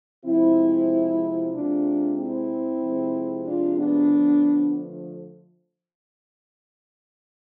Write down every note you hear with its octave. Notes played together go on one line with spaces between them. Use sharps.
C3 F3 G#3 C4 E4
C3 G#3 D4 F4
C4 E4
C3 F3 G#3
D4 F4
B3 D4
D3 F3 A3